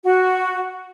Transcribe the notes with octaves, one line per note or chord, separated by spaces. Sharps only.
F#4